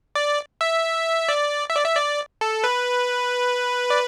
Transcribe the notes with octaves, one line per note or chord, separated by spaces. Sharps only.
D5
E5
D5
E5
D5
E5
D5
A4
B4
D5